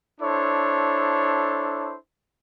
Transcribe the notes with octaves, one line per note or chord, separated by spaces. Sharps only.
D4 E4 A4 C5 C#5